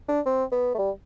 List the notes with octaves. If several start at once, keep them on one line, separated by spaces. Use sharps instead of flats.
D4
C4
B3
A3
G3